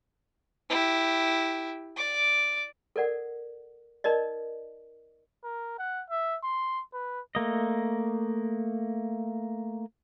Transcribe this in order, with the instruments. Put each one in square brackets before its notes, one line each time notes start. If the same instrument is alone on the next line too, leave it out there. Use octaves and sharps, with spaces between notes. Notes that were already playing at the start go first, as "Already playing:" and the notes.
[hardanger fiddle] E4 G4
D5 D6
[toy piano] A4 A#4 D5 F#5
D#4 A#4 D5 D#5
[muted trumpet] A#4
F#5
E5
C6
B4
[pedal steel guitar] A3 A#3 D#5